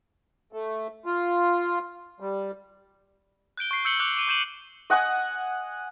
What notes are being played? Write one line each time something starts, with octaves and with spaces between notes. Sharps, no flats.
A3
F4
G3
F#6 G6 D7 G7
C#6 C7
E6 G6 C#7 F#7 G7
D6 F#6 G6 C#7
D6 D#7 G7
C#6 G6 D#7 E7 F#7
D#5 F#5 G#5 D#6